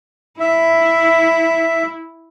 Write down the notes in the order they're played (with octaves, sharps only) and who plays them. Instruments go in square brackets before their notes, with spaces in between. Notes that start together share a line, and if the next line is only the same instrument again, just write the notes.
[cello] E4 [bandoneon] E5